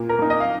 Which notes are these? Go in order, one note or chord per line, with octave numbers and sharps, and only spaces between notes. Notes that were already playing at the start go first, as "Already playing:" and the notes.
Already playing: A#2
A#4
A#3 D#4
D#5
F5